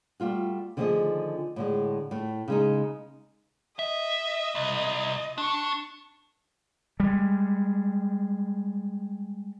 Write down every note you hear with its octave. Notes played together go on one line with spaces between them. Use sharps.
G3 A3 F4 F#4
D3 D#3 F3 A3 G#4 D#5
A2 D3 G#3
A2 A3
C#3 G#3 D#4
D#5 E5
C2
D4 C#6
G3 G#3